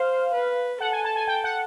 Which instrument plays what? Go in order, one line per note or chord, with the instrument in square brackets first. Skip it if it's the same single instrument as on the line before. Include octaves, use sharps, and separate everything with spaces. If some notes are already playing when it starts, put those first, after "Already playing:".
Already playing: [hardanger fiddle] C5 [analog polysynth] F5
[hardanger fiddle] B4
[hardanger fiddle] A4 [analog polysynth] F#5
[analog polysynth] G#5
A5
G#5
G5
F#5